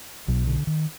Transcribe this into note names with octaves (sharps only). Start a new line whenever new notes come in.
B1 B2 F#3
D3
D#3